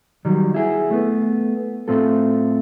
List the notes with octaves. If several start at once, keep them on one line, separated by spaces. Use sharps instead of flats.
D#3 F#3 G3
E4 G#4
A3 B3
A2 C4 F4 A4